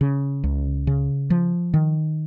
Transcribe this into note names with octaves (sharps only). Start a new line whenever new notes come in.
C#3
C#2
C#3
F3
D#3